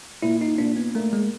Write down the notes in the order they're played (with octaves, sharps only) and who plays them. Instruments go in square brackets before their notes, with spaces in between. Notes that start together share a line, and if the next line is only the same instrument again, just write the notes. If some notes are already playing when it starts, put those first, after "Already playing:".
[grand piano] A#2 [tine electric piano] E4
[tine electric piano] D#4
[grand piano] A#2 [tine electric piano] D4
[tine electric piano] B3
[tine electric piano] A3 [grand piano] A#3
[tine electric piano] G#3